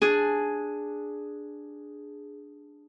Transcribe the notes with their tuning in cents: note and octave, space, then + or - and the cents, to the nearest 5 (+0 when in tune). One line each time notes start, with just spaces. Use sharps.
D4 +0 G#4 +0